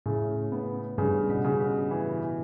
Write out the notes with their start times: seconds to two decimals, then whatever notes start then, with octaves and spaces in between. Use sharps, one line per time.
0.06 A2 C#3
0.52 B3
0.98 G2 C#3
1.30 B2
1.45 C#3
1.60 B2
1.91 E3